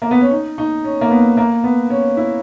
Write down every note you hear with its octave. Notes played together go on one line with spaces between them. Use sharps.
A#3
B3
C#4
D#4
D#4
C#4
A#3
B3
A#3
B3
C#4
E4